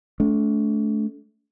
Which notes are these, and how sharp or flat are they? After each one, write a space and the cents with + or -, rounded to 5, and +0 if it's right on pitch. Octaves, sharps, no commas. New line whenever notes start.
A3 -30 D4 -45